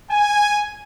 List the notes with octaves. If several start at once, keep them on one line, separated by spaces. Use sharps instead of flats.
G#5